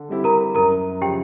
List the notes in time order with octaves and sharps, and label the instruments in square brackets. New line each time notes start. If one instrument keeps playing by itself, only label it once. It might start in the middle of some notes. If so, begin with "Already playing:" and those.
Already playing: [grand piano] D3
G3 C4 E4 G4
[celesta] A#4 A#5
[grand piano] F#2 [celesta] A#4 A#5
[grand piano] C#3 F3 [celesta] G4 G5